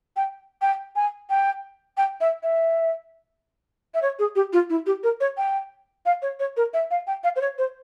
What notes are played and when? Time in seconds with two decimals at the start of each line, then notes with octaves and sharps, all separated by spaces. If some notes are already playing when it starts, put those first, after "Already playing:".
0.17 G5
0.62 G5
0.96 G#5
1.30 G5
1.97 G5
2.21 E5
2.43 E5
3.94 E5
4.02 C#5
4.19 G#4
4.36 G4
4.53 F4
4.70 E4
4.86 G4
5.03 A#4
5.20 C#5
5.37 G5
6.06 F5
6.22 C#5
6.40 C#5
6.57 A#4
6.74 E5
6.91 F5
7.07 G5
7.24 F5
7.36 C5
7.41 C#5
7.58 C5